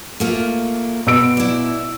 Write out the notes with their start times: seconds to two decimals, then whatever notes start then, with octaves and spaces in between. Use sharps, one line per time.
0.20 A3 A#3 F4
1.07 B2 E6 D7
1.37 E4 D5